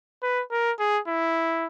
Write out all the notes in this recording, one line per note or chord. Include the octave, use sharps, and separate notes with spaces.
B4
A#4
G#4
E4